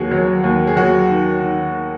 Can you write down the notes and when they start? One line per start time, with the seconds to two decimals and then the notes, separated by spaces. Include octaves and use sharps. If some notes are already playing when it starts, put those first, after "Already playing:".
Already playing: D#2 F#3 F#4 G#4
0.11 F#3
0.44 D#2
0.67 G#4
0.76 F#3 F#4
1.09 D#3
1.41 D#3